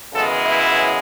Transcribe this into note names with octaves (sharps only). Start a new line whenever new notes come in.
F#2 C#3 E3 G#3 B3 A4
E4